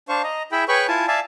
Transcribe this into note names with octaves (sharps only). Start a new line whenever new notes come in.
D4 C5 F5 C#6
D#5 A#5
E4 G#4 E5 G5 B5
G#4 B4 C#5 G5 B5 C#6
E4 F4 G#5 A5
D5 E5 F5 G#5 A5